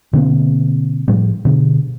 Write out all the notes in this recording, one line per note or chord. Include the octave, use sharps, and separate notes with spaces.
B2 D3 A#3 C4
A2 F3 G3
B2 D3